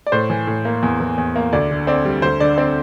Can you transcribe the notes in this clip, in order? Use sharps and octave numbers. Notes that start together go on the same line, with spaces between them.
D5
A2 C5
E3
A2
A#3
E2
E3
E2
A#3
D2 D5
D3
C4 D5
G3
D2 C5
D3 D5
C4 D5